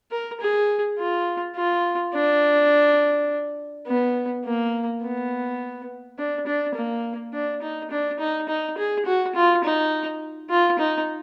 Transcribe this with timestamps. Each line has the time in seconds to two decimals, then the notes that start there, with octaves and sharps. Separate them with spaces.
0.11 A#4
0.40 G#4
0.99 F4
1.56 F4
2.14 D4
3.87 B3
4.45 A#3
5.03 B3
6.18 D4
6.47 D4
6.75 A#3
7.34 D4
7.62 D#4
7.91 D4
8.20 D#4
8.49 D#4
8.77 G#4
9.06 F#4
9.35 F4
9.64 D#4
10.50 F4
10.79 D#4